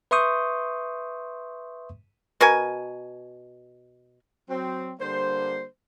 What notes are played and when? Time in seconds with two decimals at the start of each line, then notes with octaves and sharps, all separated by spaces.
0.11 B4 E5 C6 C#6 D#6 G6
2.41 B2 F#4 A#4 G#5
4.49 F#3 C4
4.99 D3 G3 A#3 C5